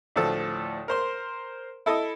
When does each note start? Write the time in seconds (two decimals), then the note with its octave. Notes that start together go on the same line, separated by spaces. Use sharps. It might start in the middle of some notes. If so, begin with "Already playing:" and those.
0.16 D2 A2 F3 A4
0.88 A#4 C5 C6
1.86 E4 A4 D#5 D#6